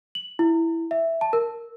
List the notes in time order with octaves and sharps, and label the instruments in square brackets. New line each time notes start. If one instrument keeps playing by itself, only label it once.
[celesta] F#7
E4
E5
A5
A#4